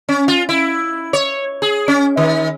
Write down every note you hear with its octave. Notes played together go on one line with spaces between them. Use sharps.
C#4
F4
E4
C#5
G#4
C#4
D#3